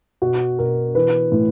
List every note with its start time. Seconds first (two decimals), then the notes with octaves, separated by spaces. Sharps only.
0.22 B2 F#4
0.59 B2 A#4
0.95 E3 B4
1.32 A2